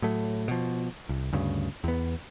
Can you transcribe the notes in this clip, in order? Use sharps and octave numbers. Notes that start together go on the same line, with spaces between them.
A2 F#3 A3
B2 F3
C2
D2 G2 C#3
E2 B3